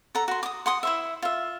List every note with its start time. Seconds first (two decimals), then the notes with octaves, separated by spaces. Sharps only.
0.15 A4 F#5 A#5
0.28 F#4 C6
0.43 D6 D#6
0.66 F#5 C6 D#6
0.83 E4 C5 E5
1.22 F4 E5